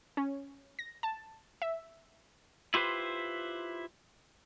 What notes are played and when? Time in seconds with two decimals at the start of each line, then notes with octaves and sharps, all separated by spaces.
0.17 C#4
0.79 A#6
1.03 A5
1.62 E5
2.74 E4 F4 G4 B4 C5